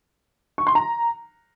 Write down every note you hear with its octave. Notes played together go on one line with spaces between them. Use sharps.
C#6
C6
A#5